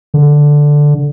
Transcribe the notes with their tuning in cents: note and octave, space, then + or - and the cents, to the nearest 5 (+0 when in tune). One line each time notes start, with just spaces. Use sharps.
D3 +0